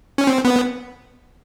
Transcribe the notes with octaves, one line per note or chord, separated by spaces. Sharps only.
C#4
C4
B3